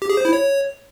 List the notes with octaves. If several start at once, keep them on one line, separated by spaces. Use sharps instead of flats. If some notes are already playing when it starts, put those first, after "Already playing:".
G4
G#4
C5
E4
C#5